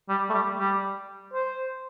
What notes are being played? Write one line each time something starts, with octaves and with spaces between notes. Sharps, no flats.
G3
A3
G3
G3
C5